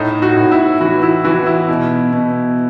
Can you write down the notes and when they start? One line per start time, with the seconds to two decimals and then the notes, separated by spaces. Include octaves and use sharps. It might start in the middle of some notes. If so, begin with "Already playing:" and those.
Already playing: A2 D#4
0.22 F#4
0.37 A2
0.51 E4
0.80 E3 F#4
1.02 E4
1.24 E3 F#4
1.46 E4
1.69 B2
2.12 B2